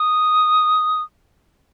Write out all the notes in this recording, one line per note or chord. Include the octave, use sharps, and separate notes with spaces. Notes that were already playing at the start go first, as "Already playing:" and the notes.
Already playing: D#6